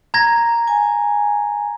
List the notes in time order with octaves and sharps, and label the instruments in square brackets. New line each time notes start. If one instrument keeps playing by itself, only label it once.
[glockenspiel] A#5 G#6 A#6
[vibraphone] G#5